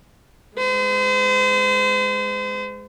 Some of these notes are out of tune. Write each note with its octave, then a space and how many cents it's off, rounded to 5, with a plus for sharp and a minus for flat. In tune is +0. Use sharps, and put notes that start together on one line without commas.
G#3 +0 C5 -40